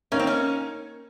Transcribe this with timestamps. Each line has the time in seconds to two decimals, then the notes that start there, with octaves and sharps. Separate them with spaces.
0.12 A#3 C#4 D#4 A#4 C#5
0.19 C4
0.27 C#4